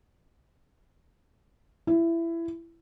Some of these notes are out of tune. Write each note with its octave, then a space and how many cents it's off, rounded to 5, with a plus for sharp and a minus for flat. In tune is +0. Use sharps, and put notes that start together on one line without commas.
E4 +20